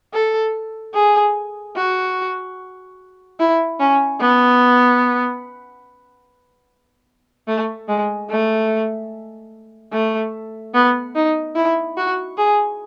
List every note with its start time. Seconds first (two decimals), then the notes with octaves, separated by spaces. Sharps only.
0.13 A4
0.94 G#4
1.76 F#4
3.40 E4
3.80 C#4
4.20 B3
7.48 A3
7.88 G#3
8.30 A3
9.92 A3
10.74 B3
11.15 D#4
11.56 E4
11.97 F#4
12.37 G#4